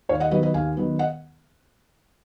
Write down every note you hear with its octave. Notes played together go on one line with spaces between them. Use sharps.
D#2 C#5 F5
D#5 F#5
D#3 F#3 B3 B4 D#5
B4 D#5
D#2 F5 G#5
D#3 F#3 B3
D#5 F#5